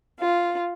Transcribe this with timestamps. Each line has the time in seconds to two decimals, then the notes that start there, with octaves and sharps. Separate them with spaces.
0.20 F4